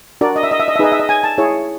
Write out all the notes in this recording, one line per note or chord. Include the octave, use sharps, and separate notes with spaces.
D4 F#4 A#4 D5
D#5
E5
D#5
E5
D#5
E5
D#4 G#4 B4 D#5
E5
D#5
G#5
A5
E4 G#4 C#5